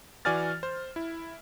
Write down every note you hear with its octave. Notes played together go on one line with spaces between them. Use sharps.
E3 F#4 D5 G#5 F6 A6
C5
E4